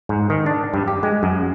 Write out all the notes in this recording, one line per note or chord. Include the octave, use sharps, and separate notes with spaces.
G#2
D#3
D4
G2
G4
G#3
F#2